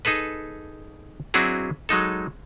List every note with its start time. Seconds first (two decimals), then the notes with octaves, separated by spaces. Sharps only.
0.05 D#4 G#4 A4 B4
1.34 F#3 C4 D4 E4 F#4 G#4
1.89 F#3 G#3 D#4 A4